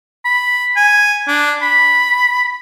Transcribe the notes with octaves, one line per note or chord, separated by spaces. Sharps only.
B5
G#5
D4
B5